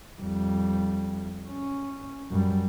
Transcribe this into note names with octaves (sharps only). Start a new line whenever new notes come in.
F2 G3
C#4
F#2 G3